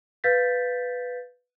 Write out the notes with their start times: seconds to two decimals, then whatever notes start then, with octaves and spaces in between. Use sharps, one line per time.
0.24 B4 F5 G6 A6 B6